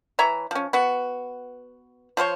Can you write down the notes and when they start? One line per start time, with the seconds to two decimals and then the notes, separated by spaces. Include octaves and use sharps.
0.19 E3 C#5 E5 A#5
0.51 F3 C#4
0.73 B3 F#4
2.17 F3 F4 C5 C#5